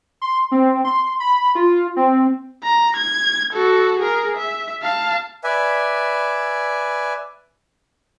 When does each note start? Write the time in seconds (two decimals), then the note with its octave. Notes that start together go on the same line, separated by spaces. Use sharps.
0.22 C6
0.52 C4
0.85 C6
1.20 B5
1.55 F4
1.96 C4
2.63 A#5
2.97 G#6
3.53 F#4 A4
3.99 G#4 A#4
4.38 E5
4.83 F5 A5
5.44 B4 D5 E5 G#5